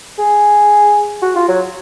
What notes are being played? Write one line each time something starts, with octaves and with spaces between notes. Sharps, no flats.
G#4
F#4
F4
F#3